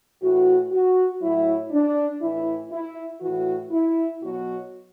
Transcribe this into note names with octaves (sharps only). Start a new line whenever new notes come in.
A2 E3 F#4
F#4
A2 F#3 E4
D4
A2 E3 E4
E4
A2 E3 F#4
E4
B2 F#3 F#4